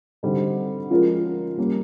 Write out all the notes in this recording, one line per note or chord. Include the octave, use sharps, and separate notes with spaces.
D3 G3 C4 D#4
F3 G#3 C#4 F4 A#4
G3 A#3 C#4